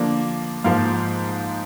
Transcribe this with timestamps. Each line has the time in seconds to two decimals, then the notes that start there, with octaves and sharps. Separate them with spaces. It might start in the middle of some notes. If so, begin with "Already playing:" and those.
Already playing: D3 F3 A#3 D4
0.64 G#2 F3 A#3 F5